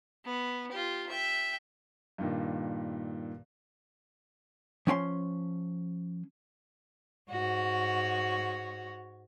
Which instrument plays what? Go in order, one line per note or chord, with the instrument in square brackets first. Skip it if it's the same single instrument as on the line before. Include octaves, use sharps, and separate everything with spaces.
[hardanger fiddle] B3
F4 G4
E5 G5
[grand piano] G2 A#2 D#3
[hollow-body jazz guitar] F3 C#4 G5 C6
[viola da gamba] G#2 F#4 C#5